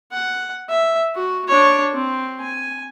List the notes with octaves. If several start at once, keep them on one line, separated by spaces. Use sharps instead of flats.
F#5
E5
F#4
D4 C#5
C4
G#5